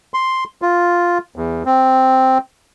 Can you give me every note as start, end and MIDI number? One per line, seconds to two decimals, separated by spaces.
0.14 0.44 84
0.62 1.18 65
1.36 1.63 40
1.66 2.38 60